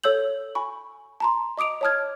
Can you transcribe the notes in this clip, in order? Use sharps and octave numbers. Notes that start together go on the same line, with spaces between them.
A4 C#5 E6 G6 F#7
G#5 B5 C#6
A5 A#5 C6
D#5 D6 D#6 D7 F7
C#5 D#5 A5 D#6 F6 G#6